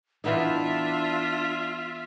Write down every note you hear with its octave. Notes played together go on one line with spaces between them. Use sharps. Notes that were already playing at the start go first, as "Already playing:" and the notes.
E3 B3 D4 D#4 F4 E5